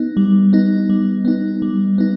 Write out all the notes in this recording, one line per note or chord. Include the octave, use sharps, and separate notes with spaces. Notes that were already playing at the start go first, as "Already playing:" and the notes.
Already playing: B3 D#4
G3
B3 D#4
G3
B3 D#4
G3
B3 D#4